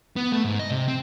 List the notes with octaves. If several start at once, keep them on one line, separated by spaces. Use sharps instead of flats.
B3
A3
G#2
D#5
C3
C4